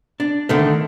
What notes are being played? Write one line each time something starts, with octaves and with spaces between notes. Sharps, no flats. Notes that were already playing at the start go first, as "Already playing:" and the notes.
D4
D3 D#3 A3